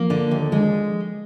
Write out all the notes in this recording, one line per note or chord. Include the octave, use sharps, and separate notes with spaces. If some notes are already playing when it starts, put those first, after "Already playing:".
Already playing: F3 A#3
D3
D#2
G#3